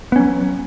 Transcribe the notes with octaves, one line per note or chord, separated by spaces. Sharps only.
F#3 B3 C#4